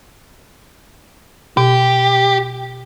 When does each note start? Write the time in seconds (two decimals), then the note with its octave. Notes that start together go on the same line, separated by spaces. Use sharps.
1.57 B2 G4